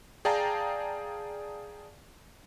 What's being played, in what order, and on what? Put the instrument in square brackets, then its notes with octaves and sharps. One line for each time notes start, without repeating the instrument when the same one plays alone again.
[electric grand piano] G#4 D5 F5 G5 A5 A#5